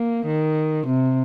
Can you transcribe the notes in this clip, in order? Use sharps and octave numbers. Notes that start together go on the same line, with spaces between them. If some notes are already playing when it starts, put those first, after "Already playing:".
Already playing: A#3
D#3
C3